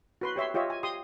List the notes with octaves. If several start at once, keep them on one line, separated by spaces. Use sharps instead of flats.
F#4 B4 C6
G4 C#5 E5 C6
F4 G4 C#5 D#5 E5
G#5
G4 C6 D#6